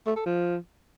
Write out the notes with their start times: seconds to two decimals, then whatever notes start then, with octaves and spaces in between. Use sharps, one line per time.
0.06 A3
0.16 A4
0.26 F3